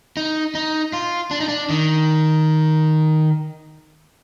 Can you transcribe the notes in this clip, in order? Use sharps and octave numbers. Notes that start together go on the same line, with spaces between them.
D#4
D#4
F4
D4
D#4
D4
D#3